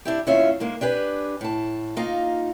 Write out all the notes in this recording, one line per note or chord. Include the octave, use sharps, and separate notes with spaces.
D4 E4 G4
D#2 A2 C#4 F4 E5
D#3 G#3 A#3
D4 G4 B4 G#5
A2 A5
A#3 D#4 F4